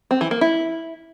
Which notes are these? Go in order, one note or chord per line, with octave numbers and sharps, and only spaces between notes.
C4
E3
A#3
E4